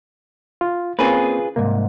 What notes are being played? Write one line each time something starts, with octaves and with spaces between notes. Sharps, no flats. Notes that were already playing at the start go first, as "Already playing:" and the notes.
F4
A#3 C4 C#4 F4 G#4 B4
C2 G#2 A#3